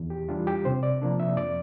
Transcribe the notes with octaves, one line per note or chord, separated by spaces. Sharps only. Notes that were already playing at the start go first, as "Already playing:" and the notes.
Already playing: E2
G4
E3 G3 D4 F4
G4
C3 C5
D5
F3 A#3 D4
E5
F2 D5